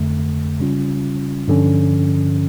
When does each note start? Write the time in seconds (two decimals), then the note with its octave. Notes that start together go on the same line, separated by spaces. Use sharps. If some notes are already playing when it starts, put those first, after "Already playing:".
Already playing: F2 D3 A3
0.59 C#3 G3 C#4 F4
1.48 G2 D3 F3 C#4